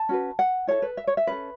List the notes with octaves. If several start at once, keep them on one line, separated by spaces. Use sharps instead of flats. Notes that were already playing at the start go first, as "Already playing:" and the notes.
Already playing: A5
C#4 F#4 B4
F#5
E4 A4 C#5
B4
E5
C#5
E5
C#4 A4 B4